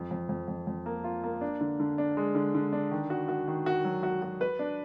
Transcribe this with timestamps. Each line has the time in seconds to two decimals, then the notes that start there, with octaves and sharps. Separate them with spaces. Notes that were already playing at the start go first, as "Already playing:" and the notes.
Already playing: F2
0.11 F2
0.29 F2
0.48 F2
0.67 F2
0.86 A#3
1.04 F4
1.24 A#3
1.41 D4
1.61 D3
1.80 D3
1.98 D4
2.17 G#3
2.35 D3
2.55 D3
2.73 D4
2.91 D#3
3.10 F#4
3.28 F#4
3.48 D#3
3.66 F#4
3.85 F#3
4.03 F#4
4.22 F#4
4.41 B4
4.59 D4